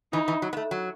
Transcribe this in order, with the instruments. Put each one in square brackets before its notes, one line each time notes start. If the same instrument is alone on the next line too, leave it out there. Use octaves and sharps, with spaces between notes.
[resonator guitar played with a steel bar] E3 [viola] D#4
[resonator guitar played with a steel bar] E3
F#3
B3
A3
F#3